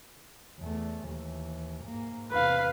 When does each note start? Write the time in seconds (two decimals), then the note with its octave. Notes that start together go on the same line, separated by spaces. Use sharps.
0.60 E2 A3
1.06 D#2 E3
1.85 G#2 A#3
2.32 E2 C3 B4 F5